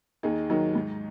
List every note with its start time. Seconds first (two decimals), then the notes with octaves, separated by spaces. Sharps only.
0.23 D#2 D#4 G#4
0.50 D#3 F#3 D#4
0.75 G#2